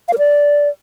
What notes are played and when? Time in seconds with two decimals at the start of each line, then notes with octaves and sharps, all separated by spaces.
0.08 F5
0.13 A#4
0.18 D5